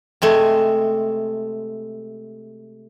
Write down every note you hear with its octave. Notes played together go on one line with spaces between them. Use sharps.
C3 G#3 A3